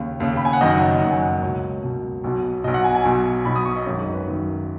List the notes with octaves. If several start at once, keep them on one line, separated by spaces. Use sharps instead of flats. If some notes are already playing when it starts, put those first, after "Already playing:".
Already playing: D#2 C#3
D#2 C#3
B5
G#5
F#5
F#1 F#2 D#3 D#5
F#5
C#5
D#5
F#1 F#2 D#3 F#5
G#5
F#5
D#5
C#2 B2 C#5
C#2 B2
B1 B2
B1 B2 D#5
F#5
G#5
G#5
B1 B2
B1 B2 B5
D#6
C#6
D#5
G#1 F#2 D#3 C#5
G#4
B4
G#1 F#2 D#3